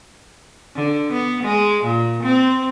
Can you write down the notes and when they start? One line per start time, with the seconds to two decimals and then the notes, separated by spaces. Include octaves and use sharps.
0.75 D3
1.13 B3
1.43 G#3
1.84 A#2
2.23 C4